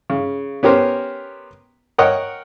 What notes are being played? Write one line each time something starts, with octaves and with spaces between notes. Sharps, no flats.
C#3
B3 C#4 G4 A#4 C5
A#4 C#5 D#5 F#5 G5